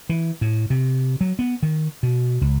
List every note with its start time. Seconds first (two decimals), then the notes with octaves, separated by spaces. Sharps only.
0.09 E3
0.41 A2
0.70 C3
1.21 F#3
1.39 B3
1.63 D#3
2.03 B2
2.41 C#2